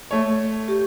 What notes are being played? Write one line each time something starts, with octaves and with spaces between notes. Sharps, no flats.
A3 C#5
G4